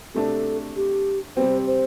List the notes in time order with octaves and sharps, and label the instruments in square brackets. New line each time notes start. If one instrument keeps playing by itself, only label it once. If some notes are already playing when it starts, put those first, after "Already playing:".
[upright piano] C3 A3 D4 [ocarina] A4
[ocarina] G4
[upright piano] C3 G3 C4 [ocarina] C5
[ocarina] C5